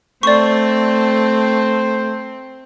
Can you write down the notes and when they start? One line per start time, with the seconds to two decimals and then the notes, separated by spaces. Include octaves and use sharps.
0.23 A3 C4 C5 D5 C#6